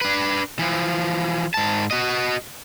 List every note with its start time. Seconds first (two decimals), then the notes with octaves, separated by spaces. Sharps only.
0.01 D4 B4
0.59 E3 F3
1.54 G#2 A5
1.91 F#4 D#5